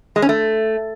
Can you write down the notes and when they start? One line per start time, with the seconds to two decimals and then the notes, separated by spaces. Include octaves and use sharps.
0.16 G#3
0.22 C#4
0.29 A3